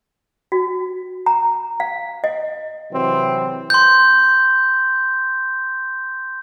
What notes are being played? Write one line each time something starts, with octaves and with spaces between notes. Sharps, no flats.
F#4
A#5
F5
D#5
C3 E3 F#3 C4
C6 G6